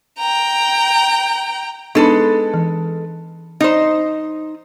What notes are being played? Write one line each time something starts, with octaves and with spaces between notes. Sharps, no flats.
G5 A#5
G#3 B3 D4 D#4 A4 B4
E3
D#4 C5